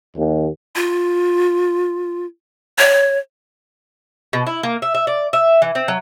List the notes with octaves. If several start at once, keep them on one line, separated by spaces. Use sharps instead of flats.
D#2
F4
C#5
B2
E4
A#3
E5
E5
D5
E5
E3
C4
F#3